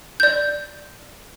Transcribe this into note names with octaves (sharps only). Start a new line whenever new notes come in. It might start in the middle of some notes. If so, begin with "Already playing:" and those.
D5 G6